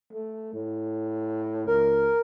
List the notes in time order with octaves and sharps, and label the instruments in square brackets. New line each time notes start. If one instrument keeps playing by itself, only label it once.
[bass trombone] A3
A2
[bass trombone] C#2 [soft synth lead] A#4